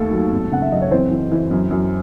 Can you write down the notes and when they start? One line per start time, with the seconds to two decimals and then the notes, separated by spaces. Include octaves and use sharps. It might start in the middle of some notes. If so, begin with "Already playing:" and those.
Already playing: D#2 A3 A4
0.11 F#3
0.32 G#1
0.51 C#3 F#5
0.62 E5
0.72 F#2 D#5
0.81 C#5
0.91 E3 C4 C5
1.11 E3
1.32 E3
1.51 F#2
1.71 F#2